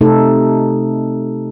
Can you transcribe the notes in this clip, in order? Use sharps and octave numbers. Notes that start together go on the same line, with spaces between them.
C3 A3 D#4 A4